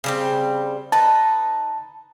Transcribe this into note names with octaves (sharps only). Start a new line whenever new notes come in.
C#3 G3 C4
D#4 B4 A5